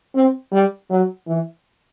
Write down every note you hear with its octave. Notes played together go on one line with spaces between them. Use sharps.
C4
G3
F#3
E3